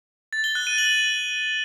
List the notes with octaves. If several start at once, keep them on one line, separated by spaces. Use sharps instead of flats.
A6
G7
F#6
D#7
F#7